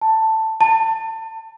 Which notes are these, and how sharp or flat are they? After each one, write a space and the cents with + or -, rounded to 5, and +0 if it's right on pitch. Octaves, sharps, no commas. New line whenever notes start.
A5 +10
A5 +25